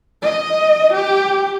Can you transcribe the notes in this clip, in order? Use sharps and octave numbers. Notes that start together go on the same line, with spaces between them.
D#5
G4